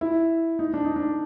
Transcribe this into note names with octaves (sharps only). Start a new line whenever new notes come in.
E4
D#4
D4
D#4
D4